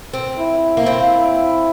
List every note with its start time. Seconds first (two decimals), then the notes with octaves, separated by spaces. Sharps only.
0.14 C4
0.38 E4
0.77 A#3
0.86 C4 E4